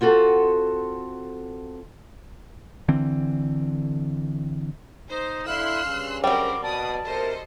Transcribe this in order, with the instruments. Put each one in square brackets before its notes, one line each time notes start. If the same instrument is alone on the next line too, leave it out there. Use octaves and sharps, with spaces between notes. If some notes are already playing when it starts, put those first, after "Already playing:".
[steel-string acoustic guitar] C4 F4 F#4 A4
[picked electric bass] D3 E3 C4
[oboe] D#4 [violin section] C5
[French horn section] D3 E4 [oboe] F5 [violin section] C6 E6 F#6
[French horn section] G2 C#3
[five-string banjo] F#3 G3 [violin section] C4 G4 A#4 [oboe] D6
[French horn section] B2 [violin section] D5 D#6 [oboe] A5
[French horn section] C3 A#4 [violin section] A4 C5 D#5